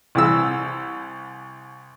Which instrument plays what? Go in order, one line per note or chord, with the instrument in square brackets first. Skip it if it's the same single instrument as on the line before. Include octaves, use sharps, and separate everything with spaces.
[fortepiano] C2 E3 E6